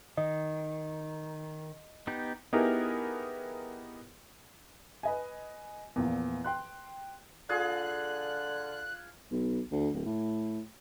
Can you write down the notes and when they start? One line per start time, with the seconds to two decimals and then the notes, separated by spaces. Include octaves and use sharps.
0.17 D#3 D#5
2.07 B3 D#4 G4
2.53 B3 D#4 E4 G4 G#4 A#4
5.03 B4 D#5 G#5
5.96 E2 A#2 F3
6.44 G5 C6 F#6
7.49 D3 F4 G#4 F#6
9.31 B1
9.72 D2
9.94 D1
10.06 A2